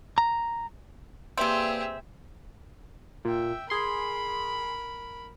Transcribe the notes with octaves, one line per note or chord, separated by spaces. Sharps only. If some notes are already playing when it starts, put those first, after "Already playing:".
A#5
C3 A#3 C4 G4 G#4 B4 D5 E5
A#2 E5 G5
G#4 A#4 B5 C6